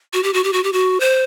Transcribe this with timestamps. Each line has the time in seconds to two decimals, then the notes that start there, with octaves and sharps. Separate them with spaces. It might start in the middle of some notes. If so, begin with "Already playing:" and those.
0.13 F#4
0.23 G4
0.34 F#4
0.44 G4
0.53 F#4
0.64 G4
0.73 F#4
1.00 C5